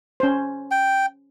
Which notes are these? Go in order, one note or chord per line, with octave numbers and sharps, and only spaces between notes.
C#4 C5
G5